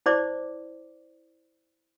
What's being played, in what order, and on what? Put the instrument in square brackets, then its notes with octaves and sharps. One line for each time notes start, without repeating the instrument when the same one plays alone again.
[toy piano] E4 C5 D5 D6